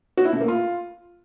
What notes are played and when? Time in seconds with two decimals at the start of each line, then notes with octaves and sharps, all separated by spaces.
0.17 F#4
0.25 E4
0.33 A3
0.41 A#3
0.48 F4